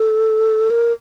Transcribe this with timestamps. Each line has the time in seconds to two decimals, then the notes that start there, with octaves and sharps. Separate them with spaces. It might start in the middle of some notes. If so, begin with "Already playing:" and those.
Already playing: A4
0.70 A#4